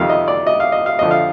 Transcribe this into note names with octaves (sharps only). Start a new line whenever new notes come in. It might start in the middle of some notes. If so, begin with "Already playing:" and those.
Already playing: F2 C3 D#3 F5
D#5
D5
D#5
F5
D#5
F5
F2 D3 F3 D#5
F5